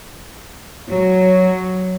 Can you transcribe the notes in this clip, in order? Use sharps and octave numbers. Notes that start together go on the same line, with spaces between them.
F#3